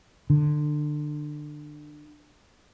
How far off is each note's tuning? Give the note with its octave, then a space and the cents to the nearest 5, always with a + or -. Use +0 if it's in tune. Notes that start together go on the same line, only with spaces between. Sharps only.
D3 +25